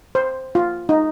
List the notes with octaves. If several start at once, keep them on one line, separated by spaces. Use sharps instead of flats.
C5
F4
D#4